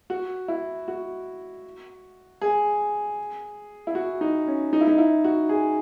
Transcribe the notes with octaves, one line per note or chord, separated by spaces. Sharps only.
F#4
E4
F#4
G#4
E4
F#4
D#4
C#4
D#4
E4
D#4
E4
F#4
G#4